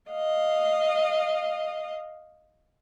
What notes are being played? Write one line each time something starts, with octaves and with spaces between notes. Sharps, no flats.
D#5 F5